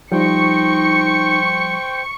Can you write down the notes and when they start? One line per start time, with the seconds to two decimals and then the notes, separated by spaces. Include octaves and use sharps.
0.12 F3 G3 D#4 C5 G5 C#6 C#7